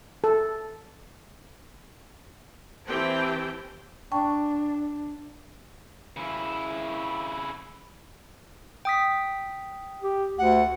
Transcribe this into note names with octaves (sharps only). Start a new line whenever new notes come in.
A4
E3 C4 G4 G5 A5
D4 G5 A5 C#6
C#3 E4
G5 D#6 B6
G4
D2 F#5